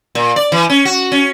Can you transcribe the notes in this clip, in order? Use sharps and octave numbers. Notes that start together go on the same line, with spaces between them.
A#2
D5
E3
C#4
F#4
C#4